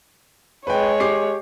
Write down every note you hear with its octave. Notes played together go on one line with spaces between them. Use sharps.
G#3 B4 C#5 G5
G4 D6 C7